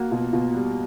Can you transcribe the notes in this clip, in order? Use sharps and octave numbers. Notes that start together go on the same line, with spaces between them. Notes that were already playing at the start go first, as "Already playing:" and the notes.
Already playing: A#3 F#4
B2 F4
B2 F4
G3